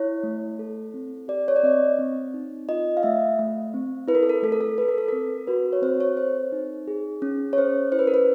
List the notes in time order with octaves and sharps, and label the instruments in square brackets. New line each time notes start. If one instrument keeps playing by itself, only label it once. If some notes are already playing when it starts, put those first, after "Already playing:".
Already playing: [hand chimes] E4 C#5
A3
A4
C4
G4 D5
C#5
D5
C4 D#5
C4
D#4
F4 D#5
F5
A3 E5
A3
C4
E4 B4
A#4
A4
A#4
A3 A4
A#4
A4
A4 B4
A#4
A4
C4 A#4
F#4 B4
C#5
C4 C5
C#5
A4 C5
D#4
G#4
C#4
C#5
C#4 C5
E4 C5
B4
A#4
B4